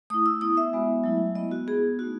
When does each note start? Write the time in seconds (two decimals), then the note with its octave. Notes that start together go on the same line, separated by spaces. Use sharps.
0.10 A3 E4 D#6
0.26 E6
0.41 B3 E4 D#6
0.57 E5
0.73 G#3 B3 F#4
1.04 F#3 A3 E4
1.35 G#3 B3 E4 D#5
1.51 F#4
1.67 B3 E4 G#4
1.99 A3 D#4 F#4